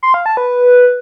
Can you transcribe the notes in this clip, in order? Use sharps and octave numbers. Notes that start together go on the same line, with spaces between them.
C6
F5
A5
B4